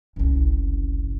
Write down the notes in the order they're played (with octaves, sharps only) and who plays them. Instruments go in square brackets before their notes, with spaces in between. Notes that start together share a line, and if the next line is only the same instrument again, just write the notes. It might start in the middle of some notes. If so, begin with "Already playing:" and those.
[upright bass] F#1 C2